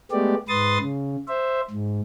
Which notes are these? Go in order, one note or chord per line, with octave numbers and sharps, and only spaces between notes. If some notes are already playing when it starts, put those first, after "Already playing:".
G#3 A3 B3 G4 D5
G#2 B4 C6 D#6 A6
C#3
C5 E5
G#2